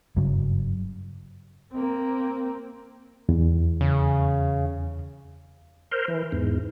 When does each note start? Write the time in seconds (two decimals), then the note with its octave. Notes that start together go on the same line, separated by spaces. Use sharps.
0.17 F#1 G2 C#3 F#3
1.72 A#3 C4
3.29 E2
3.81 C#3
5.91 A#4 C5
6.08 E3
6.32 E2 G#2